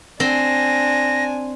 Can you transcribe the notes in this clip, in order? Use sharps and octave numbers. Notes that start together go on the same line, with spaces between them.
C4 D4 G#5 A#6